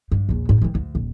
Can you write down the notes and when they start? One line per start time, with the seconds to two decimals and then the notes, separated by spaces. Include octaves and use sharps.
0.12 G2
0.29 A#1 E2
0.49 G#2
0.61 D#3 E3
0.75 D2
0.95 D#1